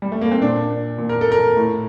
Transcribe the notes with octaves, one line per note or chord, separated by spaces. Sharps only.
G3
A3
A#3
C4
A#2 D4
A#2
A#4
A4
A#4
A2